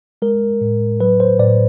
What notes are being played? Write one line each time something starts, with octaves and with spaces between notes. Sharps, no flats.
G#3 A#4
A2
F#3 B4
C5
A2 D5